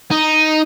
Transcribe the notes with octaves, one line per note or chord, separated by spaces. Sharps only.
D#4